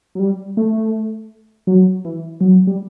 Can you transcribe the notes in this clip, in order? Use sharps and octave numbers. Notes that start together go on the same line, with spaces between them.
F#3
G3
A3
F#3
E3
F#3
G3